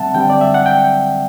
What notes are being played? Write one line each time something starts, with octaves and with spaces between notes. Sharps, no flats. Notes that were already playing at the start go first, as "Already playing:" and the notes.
Already playing: D3 G3 C4 E5 F#5 A5
D3 G3 C4 G5
D5
E5
F#5
G5